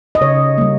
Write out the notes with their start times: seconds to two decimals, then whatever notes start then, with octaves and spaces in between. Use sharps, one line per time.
0.15 D#5
0.21 C#3 C#5
0.58 G3 A#3